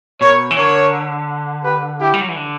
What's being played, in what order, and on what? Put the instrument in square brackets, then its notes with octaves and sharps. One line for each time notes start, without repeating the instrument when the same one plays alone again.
[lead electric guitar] B2 [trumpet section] A#4 C#5
[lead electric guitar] E3
[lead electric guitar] D3 [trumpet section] A#4 C#5
[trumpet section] G4 B4
E4 G4
[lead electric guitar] G3
F#3
E3
D3